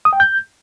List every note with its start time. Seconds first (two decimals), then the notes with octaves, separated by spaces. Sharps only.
0.05 D#6
0.13 G5
0.20 G6